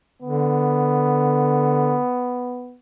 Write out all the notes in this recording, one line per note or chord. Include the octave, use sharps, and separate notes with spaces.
D3 B3